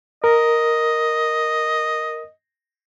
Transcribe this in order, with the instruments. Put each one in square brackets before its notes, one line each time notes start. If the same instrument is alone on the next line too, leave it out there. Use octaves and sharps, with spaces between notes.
[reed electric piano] A#4 [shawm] D#5